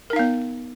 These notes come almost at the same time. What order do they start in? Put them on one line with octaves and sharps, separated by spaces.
A#4 D#4 F5 B3